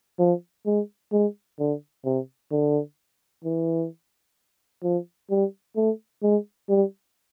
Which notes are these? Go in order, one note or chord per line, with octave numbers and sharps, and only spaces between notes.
F3
G#3
G#3
D3
C3
D3
E3
F3
G3
A3
G#3
G3